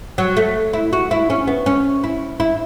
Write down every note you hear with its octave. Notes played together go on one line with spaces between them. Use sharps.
F#3
A3
E4
F#4
E4
C#4
B3
C#4
E4
E4